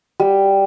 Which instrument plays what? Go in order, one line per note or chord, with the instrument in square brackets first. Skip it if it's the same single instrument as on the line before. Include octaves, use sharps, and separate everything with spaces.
[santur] G3